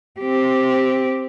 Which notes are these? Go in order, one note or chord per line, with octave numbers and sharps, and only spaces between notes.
C4 G4